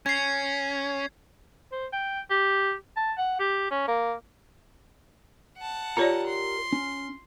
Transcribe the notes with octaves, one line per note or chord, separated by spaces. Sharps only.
C#4 G#6 C7
C5
G5
G4
A5
F#5
G4
C#4
A#3
F#5 A5
F4 G4 A#4 C#5 D5 A#5
C6
C#4